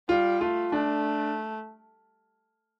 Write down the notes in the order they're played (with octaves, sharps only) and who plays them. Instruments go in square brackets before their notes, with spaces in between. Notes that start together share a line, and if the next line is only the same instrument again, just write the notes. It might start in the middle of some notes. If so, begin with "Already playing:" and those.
[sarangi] G3 [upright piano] F4
[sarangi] A3 [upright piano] F4
[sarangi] A3 [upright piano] D4